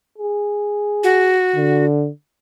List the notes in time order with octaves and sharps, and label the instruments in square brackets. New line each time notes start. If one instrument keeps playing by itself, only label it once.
[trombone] G#4
[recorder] F#4
[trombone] D3